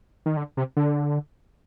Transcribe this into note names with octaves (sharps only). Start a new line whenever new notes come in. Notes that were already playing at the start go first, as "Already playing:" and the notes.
D#3
D3
C3
D3